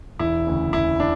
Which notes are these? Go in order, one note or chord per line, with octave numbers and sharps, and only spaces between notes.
E1 E4
D2 C#3
E1 E4
D4